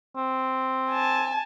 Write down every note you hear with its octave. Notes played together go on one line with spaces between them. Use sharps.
C4
G#5 A5